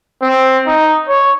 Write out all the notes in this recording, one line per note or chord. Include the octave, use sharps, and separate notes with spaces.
C4
D#4
C#5